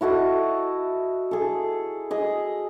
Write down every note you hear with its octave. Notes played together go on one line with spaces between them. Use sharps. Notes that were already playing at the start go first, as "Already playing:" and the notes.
E4 F#4 A4 D#5
G#4 A4
G#4 D#5